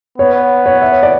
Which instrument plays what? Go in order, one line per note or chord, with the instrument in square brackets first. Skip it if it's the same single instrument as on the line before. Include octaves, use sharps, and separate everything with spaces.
[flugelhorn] B3 [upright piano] C#5
[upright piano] C#5
E5
C#5
D5